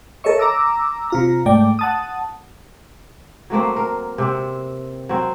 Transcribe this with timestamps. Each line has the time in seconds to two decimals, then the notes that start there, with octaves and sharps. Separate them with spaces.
0.24 A4 A#4 C#5 D#5 E5 C#6
0.39 A#5 D6 E6
1.10 C3 F4 A#5
1.46 G#2 A3 D5 G5
1.79 F#5 A5 D#6
3.50 F#3 A3 A#3 C4
3.76 A#4
4.18 C3 C4
5.09 F#3 C4